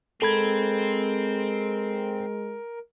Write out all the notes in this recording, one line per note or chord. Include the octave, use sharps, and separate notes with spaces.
G#3 C4 A4 A#4 B5 G#6